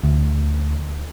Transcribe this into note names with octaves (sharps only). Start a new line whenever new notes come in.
D2